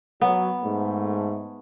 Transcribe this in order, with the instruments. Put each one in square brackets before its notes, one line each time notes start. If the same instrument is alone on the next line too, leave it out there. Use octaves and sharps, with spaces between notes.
[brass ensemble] F#3 [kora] B3
[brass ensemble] G#2 A3